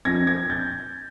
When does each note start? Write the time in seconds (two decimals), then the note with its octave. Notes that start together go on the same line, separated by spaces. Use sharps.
0.05 F2 G#6 A#6
0.27 G#6 A#6
0.50 G6 A6